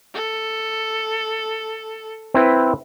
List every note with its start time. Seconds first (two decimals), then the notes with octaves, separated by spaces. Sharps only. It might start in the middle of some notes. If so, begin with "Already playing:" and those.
0.14 A4
2.34 C4 E4 B4